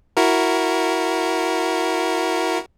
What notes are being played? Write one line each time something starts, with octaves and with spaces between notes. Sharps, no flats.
E4 F#4 A#4